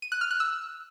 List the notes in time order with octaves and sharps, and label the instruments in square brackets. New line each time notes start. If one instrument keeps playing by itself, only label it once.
[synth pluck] D#7
F#6
F6
F#6
E6